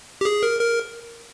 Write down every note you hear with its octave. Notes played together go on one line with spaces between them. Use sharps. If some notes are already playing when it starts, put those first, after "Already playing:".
G4
G#4
A#4
A#4